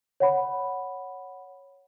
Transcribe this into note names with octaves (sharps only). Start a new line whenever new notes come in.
C#5 F#5 B5